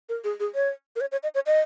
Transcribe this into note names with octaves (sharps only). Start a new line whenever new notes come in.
A#4
G#4
G#4
C#5
A#4
C#5
C#5
D#5
C#5
D#5